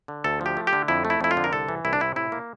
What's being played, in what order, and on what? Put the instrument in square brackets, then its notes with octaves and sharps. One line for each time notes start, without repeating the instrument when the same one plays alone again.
[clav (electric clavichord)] D3
D2 A4
F3 G4
A3
G4
D3
F2 E4
A3
E4
F2 E4
F4
D3
A#4
C2 A4
E3
C2 E4
D4
C3 E4
A2 E4
A#3